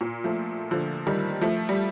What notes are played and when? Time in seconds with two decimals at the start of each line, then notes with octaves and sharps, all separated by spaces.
0.01 A#2
0.24 F3 A3
0.71 D3 F3
1.07 D#3 G3
1.41 F3 A3
1.69 G3